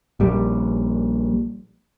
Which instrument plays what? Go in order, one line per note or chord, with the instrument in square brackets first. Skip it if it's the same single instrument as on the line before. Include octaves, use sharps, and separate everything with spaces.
[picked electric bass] A#1 G3